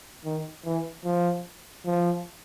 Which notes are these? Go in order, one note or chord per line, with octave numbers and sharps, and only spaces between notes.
D#3
E3
F3
F3